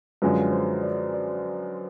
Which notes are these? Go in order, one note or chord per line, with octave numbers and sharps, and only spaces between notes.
F#2 D3 F3 G#3 C#4 B4
C5
D5
D5